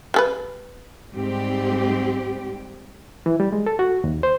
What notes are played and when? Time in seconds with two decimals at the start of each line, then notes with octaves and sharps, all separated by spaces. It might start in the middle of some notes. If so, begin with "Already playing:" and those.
0.14 G3 A4 B4
1.14 G#2 G3 C4 G4
3.26 E3
3.40 G3
3.53 G#3
3.66 A4
3.79 F#4
4.04 D#2
4.23 C5